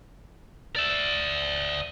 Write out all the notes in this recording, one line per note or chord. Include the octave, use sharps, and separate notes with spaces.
D5 E5